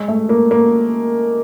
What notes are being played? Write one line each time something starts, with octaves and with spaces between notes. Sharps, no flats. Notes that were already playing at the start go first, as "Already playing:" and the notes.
Already playing: G#3
A3
A#3
A#3